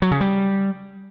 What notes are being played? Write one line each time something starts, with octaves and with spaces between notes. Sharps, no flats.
F#3
C#3
G3